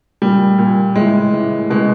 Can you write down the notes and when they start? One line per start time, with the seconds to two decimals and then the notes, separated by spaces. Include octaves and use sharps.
0.22 A#2 G3
0.58 A#2
0.95 A2 G#3
1.01 E3
1.33 A2 E3
1.70 B2 G#3